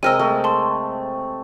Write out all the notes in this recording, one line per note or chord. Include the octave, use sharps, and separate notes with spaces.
C3 G#3 A#4 D#5 E6 F6 D#7
G#3 A3
A5 C6